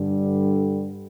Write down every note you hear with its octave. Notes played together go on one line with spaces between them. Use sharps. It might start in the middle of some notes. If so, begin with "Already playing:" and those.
Already playing: G2 D3 G3